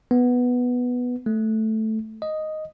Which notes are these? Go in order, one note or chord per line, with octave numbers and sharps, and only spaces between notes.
B3
A3
D#5